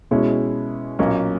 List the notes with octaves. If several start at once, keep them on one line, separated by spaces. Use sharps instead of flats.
B2 G#3 C#4 E4
B1 A#2 A#3 C#4